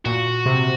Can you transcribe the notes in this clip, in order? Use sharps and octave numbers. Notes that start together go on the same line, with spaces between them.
A#2 F#4
C3